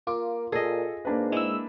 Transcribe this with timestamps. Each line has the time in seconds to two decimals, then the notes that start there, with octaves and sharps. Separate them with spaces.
0.07 A#3 F4 D6
0.52 A#2 G#4 A4 D#5
1.05 G#2 A#3 D4 B4
1.32 G#3 E4 E6